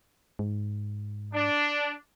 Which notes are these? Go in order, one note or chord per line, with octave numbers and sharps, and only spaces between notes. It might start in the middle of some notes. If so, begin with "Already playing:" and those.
G#2
D4